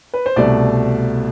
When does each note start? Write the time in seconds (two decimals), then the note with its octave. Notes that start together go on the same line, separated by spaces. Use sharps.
0.14 B4
0.26 C5
0.36 C2 B2 A3 D5